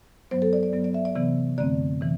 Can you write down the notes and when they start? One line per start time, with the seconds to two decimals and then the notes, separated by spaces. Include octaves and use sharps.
0.31 G2 F#3 B3 C5
0.42 A4
0.53 D5
0.63 D5
0.73 G2 F#3 B3
0.84 D5
0.94 E5
1.05 D5
1.16 C3 E3 B3
1.58 F#2 D3 A3 C4 D5
2.01 C3 E3